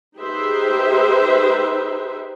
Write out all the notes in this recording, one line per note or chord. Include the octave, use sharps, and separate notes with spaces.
D#4 G4 G#4 B4 C5 E5